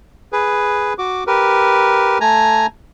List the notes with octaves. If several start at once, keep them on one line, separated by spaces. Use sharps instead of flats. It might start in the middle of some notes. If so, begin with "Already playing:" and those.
G#4 B4
F#4 D6
G4 A#4 B4
A3 G#5 A#5